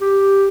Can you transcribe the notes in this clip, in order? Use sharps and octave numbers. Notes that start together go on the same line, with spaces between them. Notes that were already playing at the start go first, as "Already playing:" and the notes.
G4